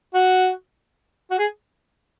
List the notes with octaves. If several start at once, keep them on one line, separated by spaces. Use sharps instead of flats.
F#4
F#4
G#4